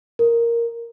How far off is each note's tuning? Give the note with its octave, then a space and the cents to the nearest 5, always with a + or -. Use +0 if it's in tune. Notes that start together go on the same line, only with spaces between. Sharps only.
A#4 +0